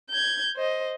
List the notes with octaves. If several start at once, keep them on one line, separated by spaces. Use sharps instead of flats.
G6 G#6
C5 D#5